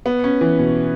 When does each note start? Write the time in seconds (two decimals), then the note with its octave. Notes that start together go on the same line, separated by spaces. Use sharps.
0.06 B3
0.24 C#4
0.41 E3
0.59 B2